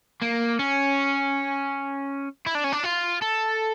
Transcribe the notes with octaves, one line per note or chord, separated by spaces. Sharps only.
A#3
C#4
E4
D4
C#4
D4
F4
A4